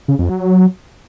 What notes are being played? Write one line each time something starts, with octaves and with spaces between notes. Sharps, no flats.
C#3
F2
F#3